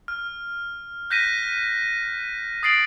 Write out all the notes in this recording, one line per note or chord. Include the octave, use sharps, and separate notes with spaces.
F6
F#6 G6 A#6 B6 D#7
D#6 A6 C7 D7 F#7